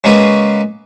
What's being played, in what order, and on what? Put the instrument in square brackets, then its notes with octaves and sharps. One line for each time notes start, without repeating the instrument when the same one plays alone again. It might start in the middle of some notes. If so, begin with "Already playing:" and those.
[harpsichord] C#3 G#3 A#3 F#4 G#4 B4